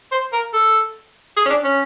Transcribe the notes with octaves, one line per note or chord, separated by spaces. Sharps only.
C5
A#4
A4
G#4
C#4
D4
C#4